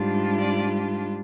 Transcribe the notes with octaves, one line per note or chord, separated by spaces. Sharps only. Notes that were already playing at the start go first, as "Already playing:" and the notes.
Already playing: G#2 G3 D4 F4
D5